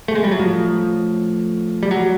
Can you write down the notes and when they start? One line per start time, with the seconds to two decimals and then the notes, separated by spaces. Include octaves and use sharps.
0.08 A3
0.15 G#3
0.24 G3
0.31 F#3
0.39 A2 F3
1.83 G3
1.91 F#3